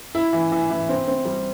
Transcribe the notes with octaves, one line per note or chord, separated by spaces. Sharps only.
E4
E3
E3
E3
C4
C4
G3